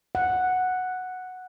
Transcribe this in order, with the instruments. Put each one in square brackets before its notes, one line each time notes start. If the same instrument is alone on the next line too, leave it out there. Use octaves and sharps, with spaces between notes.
[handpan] F#5